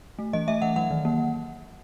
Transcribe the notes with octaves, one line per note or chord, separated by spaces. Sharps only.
A3
E3 D#5
A3 E5
E3 F#5
F#3 F#5
D#3
A#3